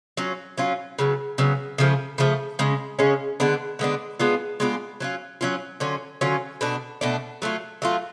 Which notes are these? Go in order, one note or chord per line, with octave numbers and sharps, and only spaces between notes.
F#3 C#4 F4
F#3 C#4 F4
C#3 F#3 B3
C#3 F#3 B3
C#3 F3 A3
C#3 F3 A3
C#3 G#3 C#4
C#3 G#3 C#4
D3 G#3 B3 D4
D3 G#3 B3 D4
G#3 B3 D4 F4
G#3 B3 D4 F4
F#3 C#4 F4
F#3 C#4 F4
D3 F#3 C#4 F4
D3 F#3 C#4 F4
B2 A3 D4
B2 A3 D4
F#3 A3 F4
F#3 A3 F4